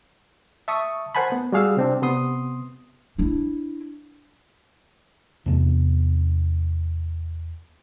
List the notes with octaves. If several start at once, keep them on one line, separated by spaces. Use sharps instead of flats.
E5 A5 C#6 D#6
A#4 C5 F#5 G#5 A5 B5
B3
G3 F#4 G#4 F5 F#5 E6
C3 C4 D4
C3 B3 C6 D#6
D4 E4
E2 C3 B3